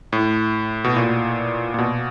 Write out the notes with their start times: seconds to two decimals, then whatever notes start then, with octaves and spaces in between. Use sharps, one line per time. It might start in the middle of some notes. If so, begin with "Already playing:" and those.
0.13 A2
0.84 B2
0.96 A#2
1.74 A#2
1.79 B2